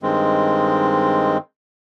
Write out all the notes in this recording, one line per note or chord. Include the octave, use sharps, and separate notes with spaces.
G2 D#3 G#3 C4